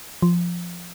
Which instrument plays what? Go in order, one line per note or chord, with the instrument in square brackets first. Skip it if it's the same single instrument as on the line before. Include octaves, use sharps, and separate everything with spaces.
[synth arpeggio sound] F3